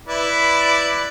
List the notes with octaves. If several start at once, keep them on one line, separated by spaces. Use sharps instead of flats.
E4 B4 D5